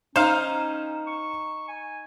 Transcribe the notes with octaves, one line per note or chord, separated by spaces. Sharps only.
C#4 D#4 C5 F5 A#5 E7
C#6
G#5